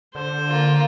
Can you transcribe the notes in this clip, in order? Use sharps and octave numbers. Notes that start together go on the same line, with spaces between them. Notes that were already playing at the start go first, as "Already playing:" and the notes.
D3 C5
A#3 F4